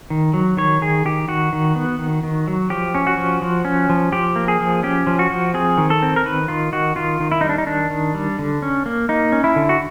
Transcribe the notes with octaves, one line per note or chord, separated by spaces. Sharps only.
D#3
F#3
D#3 C#5
D#3 G#4
D#3 G4
D#3 F#4
D#3
B3
D#3
D#3
F#3
F3 G4
C#4
F#4
F3
F3
C#4
F3
F3 G4
A#3
G#4
F3
C#4 G4
F3
F#4
F3
C4 G#4
D#3
A4
C4
A#4
D#3 B4
D#3 F4
D#3 F#4
D#3 F4
D#3
E4
D#4
G3
D4
D#4
D#3 D4
D#3
G3
D3
C#4
A#3
A#3 D#4
C#4
E4
D3
F#4